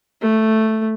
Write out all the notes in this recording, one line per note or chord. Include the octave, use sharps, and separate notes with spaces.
A3